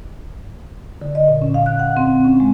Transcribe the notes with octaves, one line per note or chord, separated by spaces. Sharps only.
D3
D#5
A#2
C#4
F5
F#6
F#5
C4
C#4
G#3